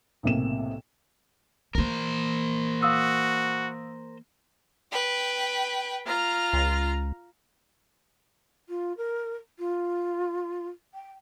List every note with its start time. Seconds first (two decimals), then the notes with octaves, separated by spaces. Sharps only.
0.23 B1 A2 C3 A#3 E7
1.75 E3 A#3 A#4 C5
2.82 F#4 F5 D#6 E6
4.90 B4 G5
6.06 F4 A#5 F6
6.53 C#2
8.69 F4
8.97 A#4
9.59 F4
10.94 G5